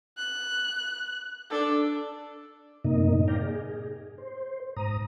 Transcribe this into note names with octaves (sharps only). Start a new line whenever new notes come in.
F#6
D4 A4
F#2 A2 C3 A#3 D#4 D#5
D5 F5 G5 A#5
G#4
C5
G#2 A#5 D#6